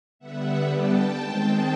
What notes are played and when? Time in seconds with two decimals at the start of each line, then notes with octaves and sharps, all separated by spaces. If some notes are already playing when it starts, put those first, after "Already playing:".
0.19 D3 G3 B3 E5 F#5
0.66 G5 A5
1.14 D#3 G#3 C4